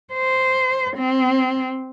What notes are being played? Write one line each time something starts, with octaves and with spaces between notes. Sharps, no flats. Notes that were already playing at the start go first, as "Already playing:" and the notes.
C5
C4